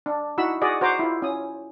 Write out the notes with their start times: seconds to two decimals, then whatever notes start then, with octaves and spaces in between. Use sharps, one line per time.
0.06 D4
0.38 D#4 E4 F#4 B5 E6
0.62 F#4 G#4 D5 D#5
0.81 F#4 C5 A#5 D6
0.99 E4 F4
1.22 C#4 D#6